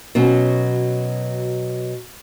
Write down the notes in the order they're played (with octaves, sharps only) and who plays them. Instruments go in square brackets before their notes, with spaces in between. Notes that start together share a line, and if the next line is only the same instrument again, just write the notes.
[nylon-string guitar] B2 F#3 C#4